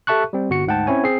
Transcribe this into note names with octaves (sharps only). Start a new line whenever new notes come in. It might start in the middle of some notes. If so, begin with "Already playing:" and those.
G4 A4 E5 A5 C#6 F#6
G3 C4
G1 F#4 C#7
D2 G#2 F#5 G5 A5
C4 C#4 E4 C#5 G#5
C4 G#4 C7